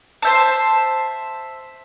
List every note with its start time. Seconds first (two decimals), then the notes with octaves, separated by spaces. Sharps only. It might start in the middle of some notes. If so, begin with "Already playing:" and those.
0.22 C5 E5 A5